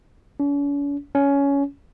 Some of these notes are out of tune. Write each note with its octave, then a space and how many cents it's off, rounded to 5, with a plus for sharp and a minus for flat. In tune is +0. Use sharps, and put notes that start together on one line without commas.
C#4 +45
C#4 +15